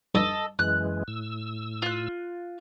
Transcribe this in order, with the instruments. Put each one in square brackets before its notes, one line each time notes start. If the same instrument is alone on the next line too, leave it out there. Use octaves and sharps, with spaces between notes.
[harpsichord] G2 [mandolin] A4 D#5
[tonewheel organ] F#2 E3 G#3 [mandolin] F#6
[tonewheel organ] A2 E6
[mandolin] F4 F#6